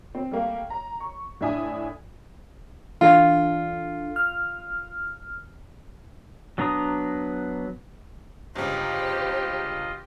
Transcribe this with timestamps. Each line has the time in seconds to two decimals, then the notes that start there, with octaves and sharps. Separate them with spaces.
0.15 C4
0.31 G3 A3 A#3
0.70 A#5
1.00 C#6
1.41 A2 D4 E5 G#5 D#6
3.01 E3 D4 F4 A4
4.16 F6
6.58 F#3 B3 D4 A#5 D#6
8.55 G1 C#2 F4 G4 C5 D#5